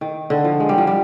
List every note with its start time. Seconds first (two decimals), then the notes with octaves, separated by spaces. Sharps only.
0.01 D#3
0.30 D3
0.44 F3
0.60 G#3
0.69 G3
0.78 F3
0.87 G3